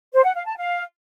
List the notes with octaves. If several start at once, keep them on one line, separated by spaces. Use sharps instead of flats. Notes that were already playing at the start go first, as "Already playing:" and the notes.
C5
F#5
F5
A5
F5